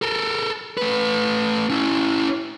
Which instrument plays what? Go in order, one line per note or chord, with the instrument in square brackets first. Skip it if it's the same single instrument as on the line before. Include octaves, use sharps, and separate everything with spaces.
[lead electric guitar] A4 A#4
A3 B4
C#4 E4